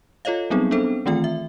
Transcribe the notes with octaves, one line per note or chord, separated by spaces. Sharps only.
F4 A4 C#5 D#5 F5
F#3 G3 B3 C4 D#4 G#4
B3 C4 D4 A4 C5
D#3 E3 A3 C4 F4 G5
E5